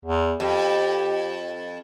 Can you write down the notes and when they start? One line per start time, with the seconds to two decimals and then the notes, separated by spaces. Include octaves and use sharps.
0.05 E2
0.40 F2 G4